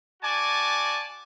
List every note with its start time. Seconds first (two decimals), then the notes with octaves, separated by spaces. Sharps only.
0.22 F#4 D5 G#5 A5 D6